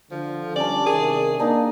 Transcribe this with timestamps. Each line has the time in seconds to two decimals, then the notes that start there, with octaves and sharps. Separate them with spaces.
0.11 D3 F3
0.56 G3 C#4 D4 D5
0.86 C3 D#3 G#4 A#4
1.40 A#3 D4 D#4